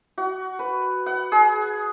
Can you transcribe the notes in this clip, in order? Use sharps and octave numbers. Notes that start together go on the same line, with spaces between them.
F#4
B4
F#5
G#4